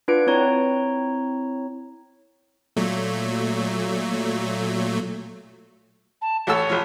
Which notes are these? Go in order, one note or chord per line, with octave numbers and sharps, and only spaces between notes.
D4 F4 B4 F#5 D6 D7
C4 E4 C#5 A#5
A#2 F#3 A3
A5
A1 A4 C#5 E6
A1 F3